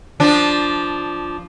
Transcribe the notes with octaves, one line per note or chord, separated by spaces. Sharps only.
F3 D4